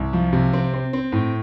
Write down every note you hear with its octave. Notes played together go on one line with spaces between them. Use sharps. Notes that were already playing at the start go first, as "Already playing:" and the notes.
Already playing: C2
F3
C3
C4
C4
C4
A2